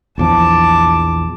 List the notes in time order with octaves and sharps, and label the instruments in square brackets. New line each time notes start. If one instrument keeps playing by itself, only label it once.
[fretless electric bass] A#1 E2 F3 [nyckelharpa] A5 D6